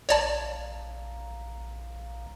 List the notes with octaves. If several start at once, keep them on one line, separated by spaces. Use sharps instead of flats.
A#1 C#5 D5 A5